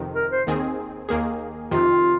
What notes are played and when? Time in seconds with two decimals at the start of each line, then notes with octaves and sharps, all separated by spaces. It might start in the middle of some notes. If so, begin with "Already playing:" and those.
Already playing: F2 C3 D#3
0.15 A#4
0.31 C5
0.47 D#2 D#3 C4 G#4
1.09 D#2 D#3 A#3 G#4
1.71 F2 C3 D#3 F4